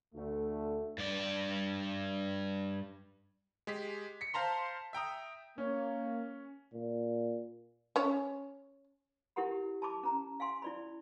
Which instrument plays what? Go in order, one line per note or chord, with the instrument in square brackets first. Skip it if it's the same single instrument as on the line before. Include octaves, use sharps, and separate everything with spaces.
[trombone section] D2 A3
[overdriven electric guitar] G2 D5
[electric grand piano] G#3 G4 B6
B6 C#7
C5 F5 A5 A#5 C6
E5 G5 A#5 D#6
[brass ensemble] A#3 [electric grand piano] C#4 C#5
[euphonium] A#2
[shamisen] C#4 C#5
[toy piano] E4 G4 A#4 F#5 B5
A5 B5 D6
C#4 A#5
F5 G#5 C6
E4 D5 B5